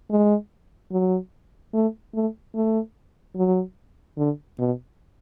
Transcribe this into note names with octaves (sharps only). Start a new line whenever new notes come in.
G#3
F#3
A3
A3
A3
F#3
D3
B2